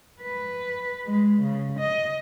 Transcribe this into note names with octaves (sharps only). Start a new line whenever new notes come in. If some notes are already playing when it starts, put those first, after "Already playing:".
B4
G#3
C#3
D#5